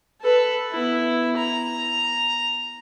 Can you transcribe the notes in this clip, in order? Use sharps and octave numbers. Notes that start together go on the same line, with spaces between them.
A4 B4
B3 E4
A#5